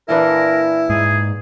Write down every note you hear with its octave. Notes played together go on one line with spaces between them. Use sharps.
A#2 E3 D4 E4 A#4
G#2 G#4